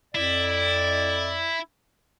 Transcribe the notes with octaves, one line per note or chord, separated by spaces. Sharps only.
F2 E4 D5